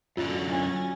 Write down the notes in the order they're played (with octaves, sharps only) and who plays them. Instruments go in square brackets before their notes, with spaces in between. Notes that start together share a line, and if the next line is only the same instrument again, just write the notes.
[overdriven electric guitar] F#2 D3 [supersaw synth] F#3 A6 A#6 [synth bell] F4
[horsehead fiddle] C#4 G#5